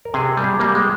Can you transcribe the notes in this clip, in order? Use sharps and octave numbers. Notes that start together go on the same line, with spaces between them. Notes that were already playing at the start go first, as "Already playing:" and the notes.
A#4
C3 G#4
G3
G#4
G3 A#3
G#3